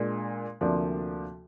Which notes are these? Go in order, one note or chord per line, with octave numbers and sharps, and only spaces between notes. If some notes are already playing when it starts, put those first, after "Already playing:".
Already playing: A#2 G#3 D4
D2 C3 F3 A#3 D4